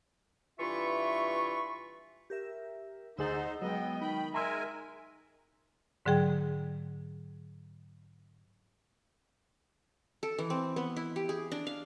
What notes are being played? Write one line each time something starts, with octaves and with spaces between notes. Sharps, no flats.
G2 E3 F4 E5 B5 C#6
G4 A#4 E5
D2 D#4 G#4 C5 F#5 E6 A6
F#3 G#3 B3 D#5 G5
D#3 D#4 G5 B5
G#3 A#4 E5 G#5 A#5 C6 E6
G#2 D3 F#3 G#4 G5
A4
E3
C4
B3
E4
G4
G#4
D4
F5